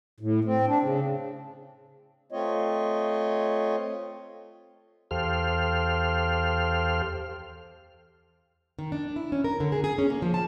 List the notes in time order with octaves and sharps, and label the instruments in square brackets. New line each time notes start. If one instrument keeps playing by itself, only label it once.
[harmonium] A2
C4
D4
C#3
A3 C4 F4 C#5 D#5
[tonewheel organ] E2 G4 A4 C5 F5 F6
[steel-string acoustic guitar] D#3
D4
E4
C#4
A#4
D3
G#4
G#4
C#4
A#3
F3
A5